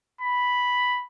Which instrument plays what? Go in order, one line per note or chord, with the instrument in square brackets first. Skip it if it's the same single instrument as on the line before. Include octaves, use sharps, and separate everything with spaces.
[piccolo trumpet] B5